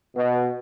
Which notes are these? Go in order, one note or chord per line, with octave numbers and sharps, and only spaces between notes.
B2